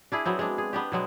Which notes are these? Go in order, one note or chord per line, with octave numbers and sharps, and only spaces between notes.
D4 E4 G#4
F#3 B3 C4
G#3 D4
G#4
B3 D4 G4
B2 F#3 G#3